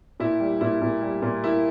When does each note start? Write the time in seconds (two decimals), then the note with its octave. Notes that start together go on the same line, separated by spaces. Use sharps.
0.20 A#2 E4
0.40 G3
0.61 A#2 E4
0.82 A#2
1.02 G3
1.22 A#2
1.44 A#3 E4